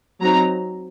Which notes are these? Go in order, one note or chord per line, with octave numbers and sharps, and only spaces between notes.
F#3 C4 D#4 A#5